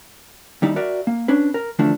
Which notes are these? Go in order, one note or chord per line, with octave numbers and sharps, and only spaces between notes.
D#2 G3 D#4 E4
F#4 A#4 D5 E5
A#3
C#4 D4 B4
A#4
D3 E3 F3 A3 D4